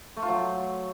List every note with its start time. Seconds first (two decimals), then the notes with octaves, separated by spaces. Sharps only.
0.16 A3
0.22 F4
0.28 F#3